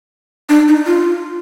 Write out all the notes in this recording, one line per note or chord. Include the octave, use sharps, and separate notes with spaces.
D4
D#4
F4